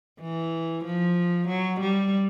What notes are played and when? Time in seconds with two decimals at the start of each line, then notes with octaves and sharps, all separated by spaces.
0.21 E3
0.85 F3
1.49 F#3
1.81 G3